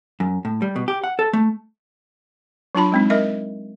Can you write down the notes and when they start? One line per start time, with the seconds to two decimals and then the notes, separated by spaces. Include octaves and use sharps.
0.20 F#2
0.45 A2
0.62 G3
0.76 B2
0.88 G4
1.04 F#5
1.19 A4
1.33 A3
2.75 F#3 D4 F4 A5 B5
2.92 G#3 C4 D#4
3.10 A#4 D#5 E5